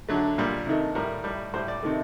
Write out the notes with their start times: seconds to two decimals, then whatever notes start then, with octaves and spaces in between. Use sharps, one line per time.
0.09 D3 F#3 A3
0.38 A#2 G3 A#4
0.66 C3 D#3 A3
0.95 A2 G3 A#4
1.24 A2 G3
1.54 A2 G3 C5
1.68 D5
1.83 C3 D#3 A3